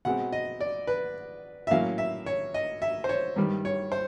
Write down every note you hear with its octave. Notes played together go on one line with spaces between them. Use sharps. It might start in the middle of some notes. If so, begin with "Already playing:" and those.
B2 G#3 C4 F#5
D#5
D5
B4
E5
A2 F#3 A#3 C#4 F5
E5
C#5
D#5
E5
C5
C#5
G2 D#3 G3
C#5
C5